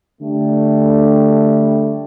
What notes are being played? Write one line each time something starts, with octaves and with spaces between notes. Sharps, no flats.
D3 G3 A3